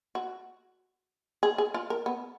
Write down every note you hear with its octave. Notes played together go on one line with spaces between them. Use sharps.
F#4
G#4
G#4
F4
A#4
B3